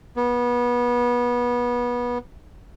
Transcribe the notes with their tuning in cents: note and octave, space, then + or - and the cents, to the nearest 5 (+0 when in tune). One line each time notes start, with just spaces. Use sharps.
B3 -25